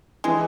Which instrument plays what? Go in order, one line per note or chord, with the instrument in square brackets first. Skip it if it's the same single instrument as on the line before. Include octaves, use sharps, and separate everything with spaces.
[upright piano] E3 [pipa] G#3